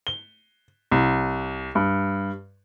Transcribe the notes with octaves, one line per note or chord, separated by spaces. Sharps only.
G7
C2
G2